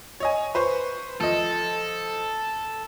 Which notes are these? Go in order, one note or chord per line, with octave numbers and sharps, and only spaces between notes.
C#5 D#5 G#5
B4 C5 C#6
F3 A4 D#5